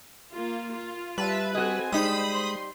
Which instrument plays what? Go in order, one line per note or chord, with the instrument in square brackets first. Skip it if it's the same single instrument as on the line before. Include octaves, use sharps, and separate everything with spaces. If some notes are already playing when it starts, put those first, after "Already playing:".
[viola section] A#3 F4
F4
[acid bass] G3 [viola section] F4 E5 A5 [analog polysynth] B4
[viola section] C4 A4 G#5 [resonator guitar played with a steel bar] F#4 D#5
[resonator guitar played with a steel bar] G3 D#4 [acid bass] G#3 [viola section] C5 [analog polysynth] B5 D#6
[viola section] C6